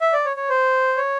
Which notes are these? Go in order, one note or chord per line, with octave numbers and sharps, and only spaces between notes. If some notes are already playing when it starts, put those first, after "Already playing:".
E5
D5
C#5
C#5
C5
C#5